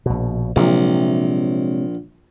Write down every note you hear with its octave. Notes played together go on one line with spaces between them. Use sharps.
A#1 B2
A#1 C3 F#3 G#3